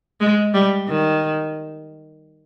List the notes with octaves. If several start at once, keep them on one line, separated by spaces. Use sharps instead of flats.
G#3
G3
D#3